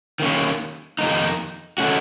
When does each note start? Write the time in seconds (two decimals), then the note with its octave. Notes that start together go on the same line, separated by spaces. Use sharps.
0.20 D#3 A#3 C#4
0.99 F2 D#3 A#3 D#4
1.78 D#3 A3 C#4 F#4